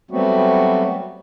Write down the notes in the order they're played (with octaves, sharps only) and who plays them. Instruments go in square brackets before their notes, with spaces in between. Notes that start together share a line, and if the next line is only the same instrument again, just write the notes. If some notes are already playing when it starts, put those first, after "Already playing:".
[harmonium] F#3 G3 A3 B3 C4 F#4